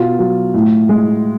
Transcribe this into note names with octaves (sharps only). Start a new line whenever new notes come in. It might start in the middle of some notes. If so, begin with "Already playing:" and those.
Already playing: B2 F4
F#3
A2
G#3